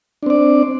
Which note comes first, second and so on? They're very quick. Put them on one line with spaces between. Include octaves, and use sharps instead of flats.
D4 C4 D5